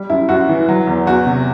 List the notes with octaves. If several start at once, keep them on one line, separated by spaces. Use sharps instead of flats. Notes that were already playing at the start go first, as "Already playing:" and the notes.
Already playing: G3
F#2 E4
F#2 F#4
E3
F#3
E2
E2 F#4
C3